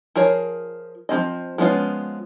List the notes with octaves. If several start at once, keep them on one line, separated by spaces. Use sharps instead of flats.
F3 G#4 A#4 C#5
F3 F#3 C4 D#5
F3 G#3 B3 C#4 F4